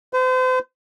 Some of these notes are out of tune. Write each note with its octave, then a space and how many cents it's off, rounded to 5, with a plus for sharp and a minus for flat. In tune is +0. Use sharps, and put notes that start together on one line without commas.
C5 -40